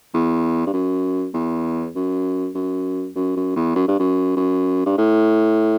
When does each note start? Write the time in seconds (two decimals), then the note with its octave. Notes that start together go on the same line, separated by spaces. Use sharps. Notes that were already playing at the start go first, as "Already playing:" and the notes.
0.14 E2
0.67 G2
0.74 F#2
1.34 E2
1.96 F#2
2.55 F#2
3.16 F#2
3.37 F#2
3.56 E2
3.76 F#2
3.88 G2
4.00 F#2
4.37 F#2
4.86 G2
4.98 A2